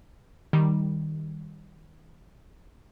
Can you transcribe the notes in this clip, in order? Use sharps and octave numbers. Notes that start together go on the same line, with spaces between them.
D#3 G3